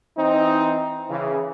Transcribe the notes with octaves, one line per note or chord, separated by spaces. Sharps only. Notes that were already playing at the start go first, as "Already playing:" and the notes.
E3 C4 D#4
C#3 E3